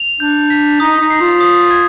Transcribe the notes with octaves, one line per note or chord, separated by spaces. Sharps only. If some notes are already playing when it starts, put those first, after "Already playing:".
Already playing: F7
D4 G6
B6
D#4 D#6
D#4
C7
F4
D#6
G#6